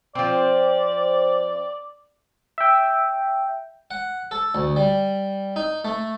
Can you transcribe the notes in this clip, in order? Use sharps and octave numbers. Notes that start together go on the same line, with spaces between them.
F3 C4 D5
E5 G5
F#5
A4
D2
G3
D#4
A3